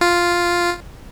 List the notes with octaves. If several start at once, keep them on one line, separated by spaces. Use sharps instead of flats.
F4